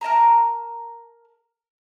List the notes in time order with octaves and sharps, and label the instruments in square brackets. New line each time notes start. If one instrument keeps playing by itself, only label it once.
[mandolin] A#4 D#5 A5 A#5